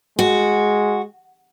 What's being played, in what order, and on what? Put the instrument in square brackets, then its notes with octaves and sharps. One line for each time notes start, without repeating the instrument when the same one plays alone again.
[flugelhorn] G#3 [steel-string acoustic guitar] F#4